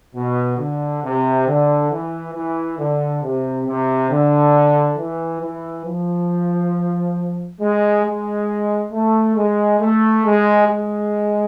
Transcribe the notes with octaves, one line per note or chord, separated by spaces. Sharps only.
B2
D3
C3
D3
E3
E3
D3
C3
C3
D3
E3
E3
F3
G#3
G#3
A3
G#3
A3
G#3
G#3